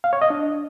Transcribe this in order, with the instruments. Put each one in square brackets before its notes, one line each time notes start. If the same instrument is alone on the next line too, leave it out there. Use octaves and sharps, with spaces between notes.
[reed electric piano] F5
C#5
D#5
D4